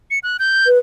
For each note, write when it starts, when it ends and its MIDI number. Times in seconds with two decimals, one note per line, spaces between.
0.11 0.19 97
0.23 0.37 90
0.39 0.68 91
0.66 0.78 71